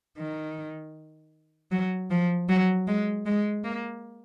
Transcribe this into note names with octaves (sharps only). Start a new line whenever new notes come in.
D#3
F#3
F3
F#3
G#3
G#3
A#3